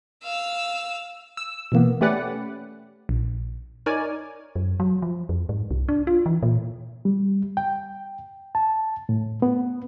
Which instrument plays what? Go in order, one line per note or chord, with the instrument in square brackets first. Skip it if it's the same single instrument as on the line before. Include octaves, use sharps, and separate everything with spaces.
[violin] F5 E6
[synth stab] E6
B2 E3 A#3 B3
A3 C#4 G4 B4 D5 F#5
A#1
D#4 A#4 C#5 D5 G#5
[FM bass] F#2
F#3
F3
F2
G#2
C2
D4
F4
E3
A#2
[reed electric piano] G3
G5
A5
A2
B3